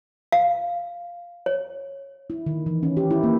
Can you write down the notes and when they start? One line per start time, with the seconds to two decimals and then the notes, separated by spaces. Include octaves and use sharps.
0.32 F5
1.46 C#5
2.30 E4
2.46 D#3
2.66 E3
2.83 C#4
2.97 G4
3.11 E4
3.23 A#3